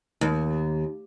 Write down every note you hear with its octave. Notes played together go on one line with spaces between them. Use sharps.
D#2